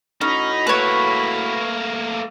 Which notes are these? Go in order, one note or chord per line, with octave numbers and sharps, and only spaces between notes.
A2 C#4 D#4 F#4 B5
A3 A#3 B4 C#5